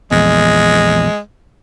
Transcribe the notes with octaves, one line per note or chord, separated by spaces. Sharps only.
A#1 E2 G#3